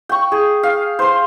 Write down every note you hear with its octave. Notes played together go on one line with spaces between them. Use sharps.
G5 C#6
G#4
F5
C5 C6